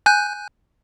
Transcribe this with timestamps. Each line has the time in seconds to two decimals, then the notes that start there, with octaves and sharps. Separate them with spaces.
0.06 G#5 F#6 G6